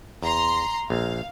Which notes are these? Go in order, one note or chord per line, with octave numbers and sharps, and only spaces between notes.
E2 A#5 C6
A#1 F5